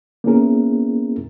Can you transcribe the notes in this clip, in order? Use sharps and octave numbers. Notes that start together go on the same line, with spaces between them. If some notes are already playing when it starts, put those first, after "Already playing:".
A#3 B3 C#4 E4 G#4 A#4